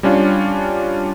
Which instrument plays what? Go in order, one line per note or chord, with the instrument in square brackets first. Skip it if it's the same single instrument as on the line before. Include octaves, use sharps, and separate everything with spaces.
[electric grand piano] G3 C#4 D4 F4